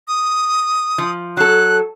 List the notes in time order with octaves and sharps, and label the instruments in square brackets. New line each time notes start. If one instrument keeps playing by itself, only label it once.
[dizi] D#6
[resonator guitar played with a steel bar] F3
[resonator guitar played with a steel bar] F#3 A4 [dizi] F#6